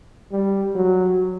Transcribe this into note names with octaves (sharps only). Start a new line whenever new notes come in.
G3
F#3